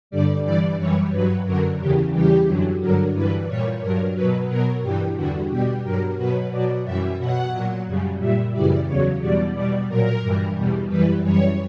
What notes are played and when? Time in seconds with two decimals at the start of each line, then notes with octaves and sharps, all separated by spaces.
0.11 G2 D3 G3 D5
0.44 G2 E3 G3 D5
0.78 F#2 E3 G3 C#5
1.12 G2 F#3 B4
1.45 F#2 D3 F#3 A#4
1.79 E2 C#3 E3 G4
2.13 E2 C#3 E3 G3 G4
2.47 F#2 D3 F#3
2.80 G2 D3 F#3 A#4
3.14 G2 E3 G3 B4
3.48 A#2 G3 C#5
3.81 G2 F#3 A#4
4.15 B2 F#3 B4
4.49 B2 F#3 A#4
4.82 G2 E3 G3 G4
5.16 E2 D3 G3 F#4
5.50 B2 G3 G4
5.84 G2 F#3 A#4
6.17 B2 F#3 B4
6.51 B2 F#3 D5
6.85 F#2 E3 G3 E5
7.19 B2 F#3 F#5
7.52 A#2 F#3
7.86 F#2 C#3 G3
8.19 A#2 G3 E5
8.53 F#2 C#3 E3 G3 D5
8.87 E2 C#3 F#3 C#5
9.21 E2 B2 G3 D5
9.54 B2 G3 D5
9.88 A#2 F#3 A#4
10.22 G2 E3 G3
10.56 E2 B2 G3
10.89 F#2 E3 G3 B4
11.23 F#2 E3 G3 C#5